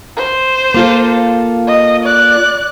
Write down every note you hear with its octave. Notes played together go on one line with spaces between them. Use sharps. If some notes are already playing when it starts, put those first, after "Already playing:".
C5
A#3 F4 A4
D#5
D5 F#6